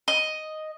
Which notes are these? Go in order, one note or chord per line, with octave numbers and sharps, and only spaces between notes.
D#5